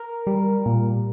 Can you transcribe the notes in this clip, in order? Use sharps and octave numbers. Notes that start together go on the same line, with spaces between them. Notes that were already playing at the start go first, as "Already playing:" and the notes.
Already playing: A#4
G3
A#2